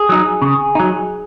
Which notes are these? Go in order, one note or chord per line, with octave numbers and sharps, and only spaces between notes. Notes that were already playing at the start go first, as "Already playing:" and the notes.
Already playing: G#4
F#3 D#4
C#3
F#3 D#4